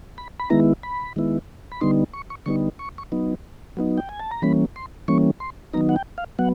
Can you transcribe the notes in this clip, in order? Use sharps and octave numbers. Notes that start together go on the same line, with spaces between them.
B5
B5
D#3 G#3 B3 E4 A#5
B5
D#3 G#3 B3 E4
B5
D3 G3 B3 D#4 C6
C#6
C#6
D3 G3 B3 D#4 C#6
C#6
C#6
F#3 B3 D#4
F#3 B3 D#4
G5
G#5
A5
A#5
E3 G3 A#3 C#4 B5
C6
E3 G3 A#3 C#4 C#6
C6
D#3 F#3 B3 D#4 A#5
F#5
G5
F5
F#3 B3 F#5